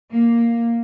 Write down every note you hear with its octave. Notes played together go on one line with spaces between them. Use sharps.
A#3